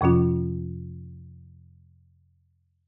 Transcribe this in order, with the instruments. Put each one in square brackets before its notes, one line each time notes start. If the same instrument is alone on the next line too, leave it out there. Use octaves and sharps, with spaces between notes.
[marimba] F2 C3 F3 C#4 F4